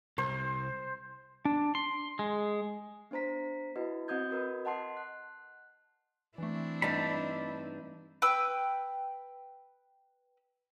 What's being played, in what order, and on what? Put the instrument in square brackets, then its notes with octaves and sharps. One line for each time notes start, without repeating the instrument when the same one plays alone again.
[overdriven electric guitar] C2 [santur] C5
[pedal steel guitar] D4
C6
G#3
[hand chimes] B3 D4 C5 A#5 B6
E4 F#4 B4 D#5
C4 F#4 D#5 D#6 G6 G#6
F#4 A#4 B4 D#5
D#5 F#5 A5 C6 C7
F#6
[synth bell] E3 A3 [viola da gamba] C4 D4 E4
[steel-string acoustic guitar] G2 D#4 [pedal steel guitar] A5 B5
[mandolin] B4 G5 E6